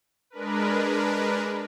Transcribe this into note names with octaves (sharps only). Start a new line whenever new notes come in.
G#3 D4 A#4 B4